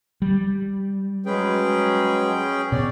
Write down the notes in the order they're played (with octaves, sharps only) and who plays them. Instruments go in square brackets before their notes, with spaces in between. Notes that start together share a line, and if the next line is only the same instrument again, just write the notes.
[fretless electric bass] G3
[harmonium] F#3 G#3 B4 [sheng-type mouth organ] C#4 G#4 G5
[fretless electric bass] B2 [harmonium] C#5 [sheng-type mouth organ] D5